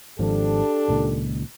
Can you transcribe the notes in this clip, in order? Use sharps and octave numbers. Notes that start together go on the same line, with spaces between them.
G#1 F3 D4 G4 A4
C#2 A#2 D#3